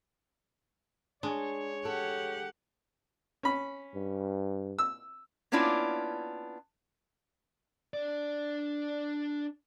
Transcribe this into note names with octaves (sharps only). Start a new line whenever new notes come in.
G#3 D4 C#5
G4 A4 F#5
C#4 B5
G2
E6
A#3 B3 C#4 D4 E4 F4
D4 D5